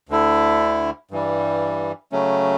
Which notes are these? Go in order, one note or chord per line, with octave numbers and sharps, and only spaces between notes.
D2 D3 A3 E4
G2 E3 G3
C#3 F#3 A3 C#4